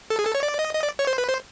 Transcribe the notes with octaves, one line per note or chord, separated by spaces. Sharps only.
A4
G#4
A4
C#5
D5
D#5
D#5
D5
C#5
C5
B4
C5